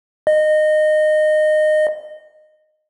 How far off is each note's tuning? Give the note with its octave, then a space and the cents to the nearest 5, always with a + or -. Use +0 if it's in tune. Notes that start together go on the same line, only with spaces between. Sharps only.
D#5 -20